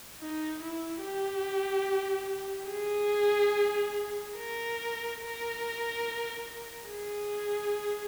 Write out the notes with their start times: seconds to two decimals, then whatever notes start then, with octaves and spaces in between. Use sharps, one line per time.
0.21 D#4
0.63 E4
1.04 G4
2.71 G#4
4.37 A#4
5.21 A#4
6.88 G#4